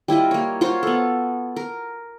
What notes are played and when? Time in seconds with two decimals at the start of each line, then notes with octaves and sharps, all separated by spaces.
0.08 G3 E4 F4 D#5
0.31 A#3 C#5
0.61 F4 F#4 C5 C#5
0.83 B3 A4
1.56 A#4